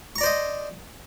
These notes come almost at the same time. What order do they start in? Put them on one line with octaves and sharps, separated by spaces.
C#6 A#5 D5 C5 D#5